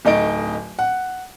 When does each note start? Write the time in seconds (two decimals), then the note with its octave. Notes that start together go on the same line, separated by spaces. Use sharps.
0.05 D1 A3 D#4 D#5 D7
0.79 F#5